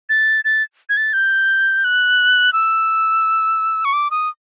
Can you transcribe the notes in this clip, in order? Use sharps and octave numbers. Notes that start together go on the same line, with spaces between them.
A6
A6
G#6
A6
G6
F#6
E6
C#6
D6
D#6